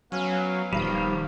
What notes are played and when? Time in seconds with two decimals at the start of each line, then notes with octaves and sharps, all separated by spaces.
0.12 F#3 B3 C#4 F5
0.73 D#1 D#3 F3 G3